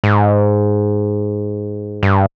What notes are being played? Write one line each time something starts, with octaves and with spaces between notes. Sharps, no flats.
G#2
G2